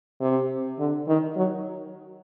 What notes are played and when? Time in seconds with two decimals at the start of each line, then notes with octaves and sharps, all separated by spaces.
0.21 C3
0.79 D3
1.08 D#3
1.36 F#3